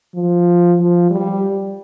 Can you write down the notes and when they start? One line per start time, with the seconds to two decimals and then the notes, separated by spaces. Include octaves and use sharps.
0.15 F3
0.78 F3
1.10 G3